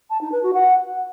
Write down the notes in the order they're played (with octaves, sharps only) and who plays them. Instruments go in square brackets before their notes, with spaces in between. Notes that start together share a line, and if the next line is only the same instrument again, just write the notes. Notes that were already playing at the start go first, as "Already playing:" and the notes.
[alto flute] A5
D#4
B4
F#4
F#5